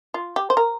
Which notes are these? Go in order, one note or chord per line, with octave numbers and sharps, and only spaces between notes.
F4
G4
C5
A#4